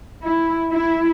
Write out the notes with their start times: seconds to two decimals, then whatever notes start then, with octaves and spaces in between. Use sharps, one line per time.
0.23 E4
0.72 E4